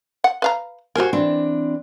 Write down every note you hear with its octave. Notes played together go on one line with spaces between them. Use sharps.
F#5
B4 F5 A#5
F#4 G4 A#4 C5 G#5
E3 C4 D4